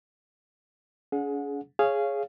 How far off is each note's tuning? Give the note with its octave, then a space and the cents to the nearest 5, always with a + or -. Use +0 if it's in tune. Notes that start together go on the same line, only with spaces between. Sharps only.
C#4 +45 G#4 +25 F#5 -30
G#4 +0 C#5 +0 F5 -15